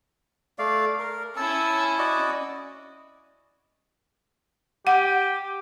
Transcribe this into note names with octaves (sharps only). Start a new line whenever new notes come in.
A3 D5 F5
A#4
C#4 E4 A5 E6
F#4 D5 D#5
G4 F#5